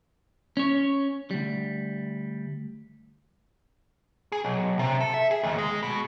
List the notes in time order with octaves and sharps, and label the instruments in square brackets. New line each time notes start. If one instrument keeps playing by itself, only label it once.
[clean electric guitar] C#4 C#5
D2 G3
[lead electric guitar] G#4
B1
C3
A4
E5
G#4
D#2
G#3
B2